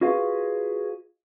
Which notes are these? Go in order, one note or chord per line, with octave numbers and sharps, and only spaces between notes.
F4 F#4 G#4 B4 D#5 F5